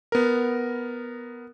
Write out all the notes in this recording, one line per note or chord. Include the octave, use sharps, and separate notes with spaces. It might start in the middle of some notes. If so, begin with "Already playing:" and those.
B3 A#4